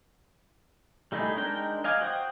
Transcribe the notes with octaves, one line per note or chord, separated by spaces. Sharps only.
G3 A3 D#4 E4 G#4
G#3 D4 D#4 A#4 G5
D#5 F5 G#5 D6
F#4 C5 G5 D#6